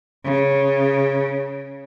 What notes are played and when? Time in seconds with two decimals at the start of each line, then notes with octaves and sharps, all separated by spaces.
0.25 C#3